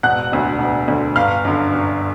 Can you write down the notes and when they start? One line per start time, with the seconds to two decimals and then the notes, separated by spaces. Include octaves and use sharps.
0.03 E1 F#5 F#6
0.32 D2 D3
0.59 E1
0.88 D2 D3
1.15 G1 F5 F6
1.45 F#2 D3
1.73 G1